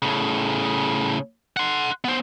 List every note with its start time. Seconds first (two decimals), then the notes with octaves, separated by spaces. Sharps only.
0.02 A2 C#3
1.57 F#5 C6
2.05 B3 C5